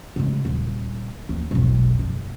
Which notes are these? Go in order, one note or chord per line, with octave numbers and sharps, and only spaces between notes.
C#3 G#3
D#1
D#2
E1 B1
F#1